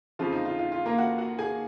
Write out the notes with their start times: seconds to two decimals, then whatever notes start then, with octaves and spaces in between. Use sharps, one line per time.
0.19 F2 C#3 F3 F4
0.32 D#4
0.45 F4
0.59 F4
0.72 F4
0.86 A#3 A#4
0.98 F#4 F#5
1.18 F#4 F#5
1.39 G#4 G#5